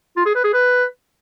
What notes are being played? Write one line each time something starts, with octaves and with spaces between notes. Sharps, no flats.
F4
G#4
B4
G#4
B4